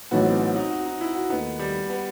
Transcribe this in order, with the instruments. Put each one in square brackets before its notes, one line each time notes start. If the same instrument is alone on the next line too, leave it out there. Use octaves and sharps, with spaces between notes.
[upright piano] A1 A2 F#3 B3 D#4 [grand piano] F#4
[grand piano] C4
C4
D#4
F#4
D#4
E4
F#4
[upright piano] D#2 D#3 A3 D#4 [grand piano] B3
[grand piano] G3
B3